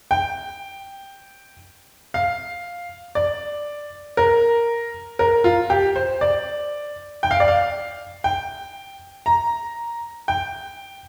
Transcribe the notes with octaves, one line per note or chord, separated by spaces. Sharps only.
G5
F5
D5
A#4
A#4
F4
G4
C5
D5
G5
F5
D5
F5
G5
A#5
G5